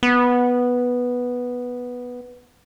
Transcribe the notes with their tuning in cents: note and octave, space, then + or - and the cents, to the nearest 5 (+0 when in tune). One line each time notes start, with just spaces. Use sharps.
B3 -5